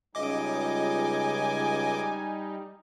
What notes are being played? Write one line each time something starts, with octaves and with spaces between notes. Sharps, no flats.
C#2 G3 D#4 D#5 G#5 D6